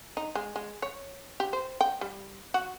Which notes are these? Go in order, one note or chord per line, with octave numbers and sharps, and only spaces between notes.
D#4
G#3
G#3
C#5
G4
C5
G5
G3
F#4